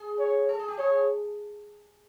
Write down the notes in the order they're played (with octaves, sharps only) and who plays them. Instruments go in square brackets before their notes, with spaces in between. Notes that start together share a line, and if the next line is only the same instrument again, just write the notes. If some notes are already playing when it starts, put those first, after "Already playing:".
Already playing: [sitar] G#4
[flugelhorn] C#5
[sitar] A4
G#4
G4
[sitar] G#4 [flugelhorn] C#5